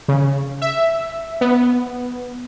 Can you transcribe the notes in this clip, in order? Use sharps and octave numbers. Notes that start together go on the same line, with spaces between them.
C#3
E5
B3